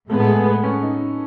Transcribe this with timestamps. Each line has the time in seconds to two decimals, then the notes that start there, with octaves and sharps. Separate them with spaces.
0.10 A2 G#3 B3 A4
0.20 A4
0.27 G#4
0.46 B4
0.63 C#4
0.82 D#4